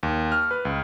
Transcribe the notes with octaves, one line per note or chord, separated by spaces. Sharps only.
D#2
F6
B4
C#2